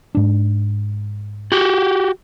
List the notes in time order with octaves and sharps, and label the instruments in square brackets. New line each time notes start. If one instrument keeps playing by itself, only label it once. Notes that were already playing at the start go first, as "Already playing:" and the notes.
[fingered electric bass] G#2 D4
[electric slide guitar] F#4 G4